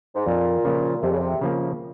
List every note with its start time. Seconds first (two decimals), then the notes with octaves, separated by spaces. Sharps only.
0.15 G#2
0.26 F2 A#2
0.64 C#3 F3 A#3
1.02 F2 C3
1.11 C#3
1.18 C3
1.41 C#3 F3 A#3